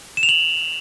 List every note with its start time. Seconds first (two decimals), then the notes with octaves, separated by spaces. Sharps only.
0.17 E7
0.23 F7
0.29 F#7